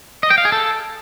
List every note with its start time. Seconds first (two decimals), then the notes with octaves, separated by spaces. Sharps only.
0.23 D#5
0.30 G5
0.38 F5
0.45 G#4
0.52 A4